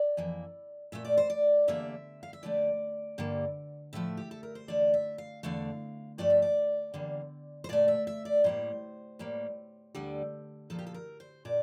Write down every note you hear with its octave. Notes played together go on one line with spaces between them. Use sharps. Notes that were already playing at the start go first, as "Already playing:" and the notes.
Already playing: D5
F2 E3 A#3
A#2 A3 E5
D5
C5
D5
E2 D3 G3 A#3 E5
F5
E5
F2 D3 A3 D5
G2 D3 G3 A#3
A2 F3 A3 E5
G4
A4
A#4
C5
E2 D3 A3 D5
E5
F5
E2 D3 A3 F5
G2 F3 A3 D5
E5
D5
E2 D3 G3 A#3
C5
A#2 A3 D5
E5
E5
D5
A2 G3 A#3 C5
A2 G3 A#3
D2 D3 G3
A#2 F3 A#3 A4
G4
A4
A#4
C5
A#2 D5